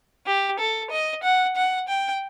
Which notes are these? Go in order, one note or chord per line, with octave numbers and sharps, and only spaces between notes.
G4
A4
D#5
F#5
F#5
G5